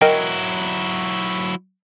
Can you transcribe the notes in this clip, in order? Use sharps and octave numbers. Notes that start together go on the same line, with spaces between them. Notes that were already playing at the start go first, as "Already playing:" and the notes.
F#3 E4 A#4 D#5 G5